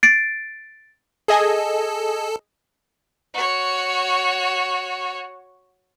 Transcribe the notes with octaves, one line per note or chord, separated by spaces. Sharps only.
A6 C7 D7
G#4 A4 D#5 G#5
F#4 C#5